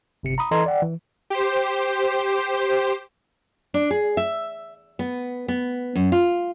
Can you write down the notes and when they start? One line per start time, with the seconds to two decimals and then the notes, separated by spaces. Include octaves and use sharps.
0.23 G1 C3 C#7
0.38 A#5 B5 D#6
0.51 E3 A4 D#5 A#5 C6 G#6
0.66 D5 F#5 G5
0.82 E3
1.30 G4 C5
3.74 D4
3.91 G#4
4.17 E5
4.99 B3
5.48 B3
5.95 F#2
6.12 F4